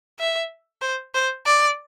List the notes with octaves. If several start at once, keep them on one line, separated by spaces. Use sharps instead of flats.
E5
C5
C5
D5